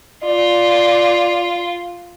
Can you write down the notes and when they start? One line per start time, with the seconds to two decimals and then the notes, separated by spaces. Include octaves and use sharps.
0.23 F4 D5